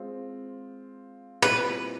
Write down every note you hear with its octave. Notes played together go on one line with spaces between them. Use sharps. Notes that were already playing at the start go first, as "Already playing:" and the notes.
Already playing: G#3 C4 F4
A#2 G3 C4 E4 B4